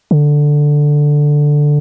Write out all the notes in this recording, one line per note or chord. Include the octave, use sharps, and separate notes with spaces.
D3